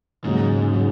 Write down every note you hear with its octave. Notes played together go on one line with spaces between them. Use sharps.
D#2 G#2 C#3 F#3
C#3 F#3